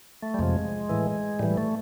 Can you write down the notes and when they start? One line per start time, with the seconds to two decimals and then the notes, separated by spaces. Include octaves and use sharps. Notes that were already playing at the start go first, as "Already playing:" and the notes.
0.22 A3
0.34 G3
0.39 F2 C3 F3 G#3
0.89 A2 E3
1.39 A2 E3 G3
1.57 A3